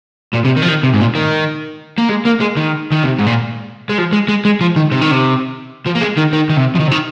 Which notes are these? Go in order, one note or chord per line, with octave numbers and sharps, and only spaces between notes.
A#2
C3
D#3
F3
D#3
C3
G#2
A#2
D#3
A#3
G#3
A#3
G#3
D#3
D#3
C3
G#2
A#2
G#3
F3
G#3
G#3
G#3
F3
D#3
C3
D#3
C3
F3
A#3
G#3
D#3
D#3
D#3
C3
F3
D#3
C3
D#3